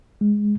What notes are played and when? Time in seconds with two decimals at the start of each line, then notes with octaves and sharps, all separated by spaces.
0.21 G#3